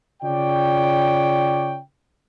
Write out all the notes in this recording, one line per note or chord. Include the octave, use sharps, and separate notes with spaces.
C#3 F4 C#5 D5 G5